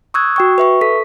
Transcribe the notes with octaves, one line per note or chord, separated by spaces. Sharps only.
C#6 D#6 E6 F#6 G#6
F#4 G5 C#6
B4 E5 C#6
A4 B6